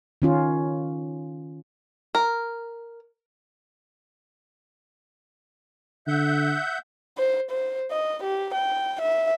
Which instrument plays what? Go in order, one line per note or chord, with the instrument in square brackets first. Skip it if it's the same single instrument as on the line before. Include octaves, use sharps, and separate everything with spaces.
[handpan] D#3 C#4 F4
[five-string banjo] A#4
[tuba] D3 [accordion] E5 F#5 G6
[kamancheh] C5
C5
D#5
G4
G5
E5